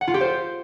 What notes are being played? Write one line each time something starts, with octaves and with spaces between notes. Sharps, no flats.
F#5
F4
G4
C5